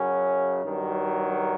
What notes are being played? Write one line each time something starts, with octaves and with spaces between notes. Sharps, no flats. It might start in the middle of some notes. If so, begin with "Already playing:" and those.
Already playing: F#2 C#3 F#3 C#4
G2 D#3 F#3